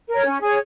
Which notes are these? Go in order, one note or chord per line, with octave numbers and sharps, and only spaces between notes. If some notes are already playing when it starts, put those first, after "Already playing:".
A#4 C#5
C#4
G#4 C#5